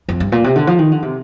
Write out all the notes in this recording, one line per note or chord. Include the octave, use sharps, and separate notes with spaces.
F2
G2
A#2
C3
D3
F3
D#3
D3
C3